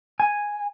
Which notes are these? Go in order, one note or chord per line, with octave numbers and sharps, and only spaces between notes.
G#5